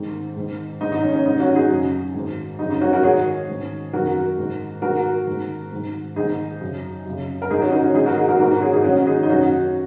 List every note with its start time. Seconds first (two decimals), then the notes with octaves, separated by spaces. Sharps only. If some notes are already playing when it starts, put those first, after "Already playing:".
Already playing: G#2 D#3
0.36 G#2 D#3
0.81 G#2 D#3 D#4
0.92 D#4
1.03 C#4
1.14 C#4
1.25 G#2 D#3 D#4
1.40 C#4 F#4
1.55 D#4 G#4
1.70 F#2 C#3
2.14 G#2 D#3
2.59 F#2 C#3 D#4
2.70 D#4
2.81 C#4 F#4
2.93 F#4 A#4
3.03 G#2 D#3 G#4 C#5
3.48 G#2 D#3
3.93 F#2 D#3 F#4 A#4
4.38 G#2 D#3
4.82 G#2 D#3 F#4 A#4
5.27 G#2 D#3
5.72 G#2 D#3
6.16 G#2 D#3 D#4 G#4
6.60 F#2 C#3
7.05 F#2 C#3
7.42 A#4
7.50 G#2 D#3 D#4 G#4
7.62 C#4 F#4
7.72 D#4
7.84 C#4 F#4
7.94 G#2 D#3 D#4 G#4
8.06 F#4 A#4
8.17 D#4 G#4
8.28 F#4 A#4
8.39 G#2 D#3 F#4 A#4
8.51 F#4 A#4
8.62 G#4 C#5
8.73 D#4 G#4
8.84 G#2 D#3 C#4 F#4
9.07 D#4 G#4
9.23 D#4
9.29 F#2 D#3 C#4 F#4